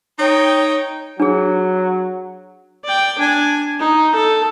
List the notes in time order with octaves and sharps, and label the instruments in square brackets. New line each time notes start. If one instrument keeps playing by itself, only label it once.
[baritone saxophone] D#4 [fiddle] C#5 G5
[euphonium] F#3 [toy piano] D4 G#4
[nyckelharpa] D5 G5
D4 G#5
D#4
A4